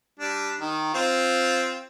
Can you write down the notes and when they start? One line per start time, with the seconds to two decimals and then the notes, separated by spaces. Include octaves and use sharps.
0.20 G3 D4
0.60 D#3
0.94 C4 F4